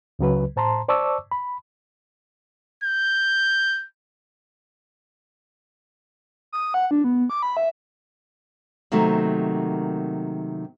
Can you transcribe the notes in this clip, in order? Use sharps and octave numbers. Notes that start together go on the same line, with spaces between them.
C#2 C#3 F#3 B4
A2 C5 A5 A#5 C6
C5 D5 A5 C#6 D6 E6
B5
G6
D#6
F#5
D4
B3
D6
B5
E5
C3 D#3 F#3 A3 A#3